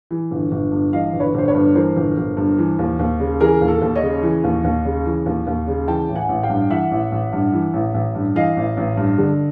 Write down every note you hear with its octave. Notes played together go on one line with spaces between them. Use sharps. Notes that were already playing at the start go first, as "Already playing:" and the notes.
E3
G1
G1
G2
E3 D#5 F5
G1
B4 C#5
G1 C5
B4 C#5
G2
E3 A#4 C5
G1
G1
G2
E3
D#2
D#2
C#3
E3 G#4 A#4
D#2
A4
D#2
C#5 D#5
C#3
E3
D#2
D#2
C#3
E3
D#2
D#2
C#3
E3 G5 A5
A1
F#5 G#5
A1
F5 G5
G2
E3 E5 F#5
A1
A1
G2
E3
A1
A1
G2
E3 D#5 F5
A1
A1
G2
D3